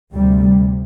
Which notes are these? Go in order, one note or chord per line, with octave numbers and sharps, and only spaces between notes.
D2 C3 G3